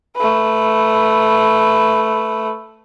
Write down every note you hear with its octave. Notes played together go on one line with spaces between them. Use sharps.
A3 B4